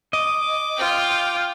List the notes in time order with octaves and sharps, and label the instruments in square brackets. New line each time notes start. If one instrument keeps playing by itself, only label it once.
[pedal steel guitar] D#5 [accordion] D6
[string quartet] F4 G5